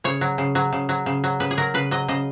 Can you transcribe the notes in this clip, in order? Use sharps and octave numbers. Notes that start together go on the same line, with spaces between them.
C#3 C#5
F#3
C#3
F#3
C#3
F#3
C#3
F#3
C#3 B4
G#4
F#3 A#4
C#3 B4
F#3 D#5
C#3 D#5